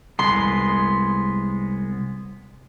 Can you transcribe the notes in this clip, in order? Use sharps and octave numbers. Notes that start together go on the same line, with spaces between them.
C2 G#3 B3 C6